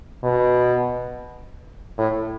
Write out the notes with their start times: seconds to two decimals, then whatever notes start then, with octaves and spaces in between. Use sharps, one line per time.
0.24 B2
1.98 A2